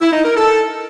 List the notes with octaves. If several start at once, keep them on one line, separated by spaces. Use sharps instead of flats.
E4
D#4
A#4
A4